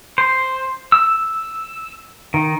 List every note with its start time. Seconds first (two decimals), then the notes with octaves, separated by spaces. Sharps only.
0.18 C5
0.92 E6
2.34 D#3